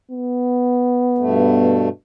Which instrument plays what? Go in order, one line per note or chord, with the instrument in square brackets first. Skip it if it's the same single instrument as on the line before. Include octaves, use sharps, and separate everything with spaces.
[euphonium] B3
[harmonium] G2 B2 A3